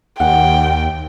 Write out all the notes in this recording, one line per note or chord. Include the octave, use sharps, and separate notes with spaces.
D#2 F#5 G5